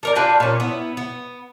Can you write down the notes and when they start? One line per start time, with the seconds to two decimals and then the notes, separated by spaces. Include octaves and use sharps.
0.03 A3 A#4 D5
0.15 D4 F4 B4 G5
0.40 A#2 C#4
0.60 B3 E4
0.97 B3